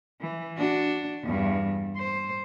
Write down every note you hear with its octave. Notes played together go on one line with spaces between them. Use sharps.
E3
D4 F#4
E2 G2
C5